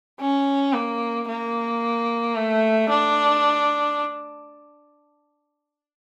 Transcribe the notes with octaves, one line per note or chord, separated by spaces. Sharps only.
C#4
A#3
A#3
A3
D4